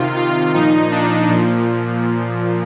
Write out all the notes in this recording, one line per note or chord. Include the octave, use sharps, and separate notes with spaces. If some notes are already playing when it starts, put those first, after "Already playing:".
Already playing: C3 D#3 F4
F4
A#2 F3 D#4
D4
A#2 F3